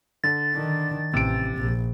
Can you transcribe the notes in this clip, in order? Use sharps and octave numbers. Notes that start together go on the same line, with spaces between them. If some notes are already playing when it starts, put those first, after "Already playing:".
D3 A6
D#3 D4
A1 C3 D7
A#1